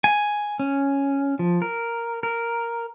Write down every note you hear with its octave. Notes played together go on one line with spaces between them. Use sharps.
G#5
C#4
F3
A#4
A#4